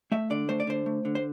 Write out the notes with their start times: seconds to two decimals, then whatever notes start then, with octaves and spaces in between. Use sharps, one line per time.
0.12 A3 E5
0.30 D3 D5
0.49 A3 C5
0.60 D5
0.67 D3 C5
0.86 A3
1.05 D3
1.15 C5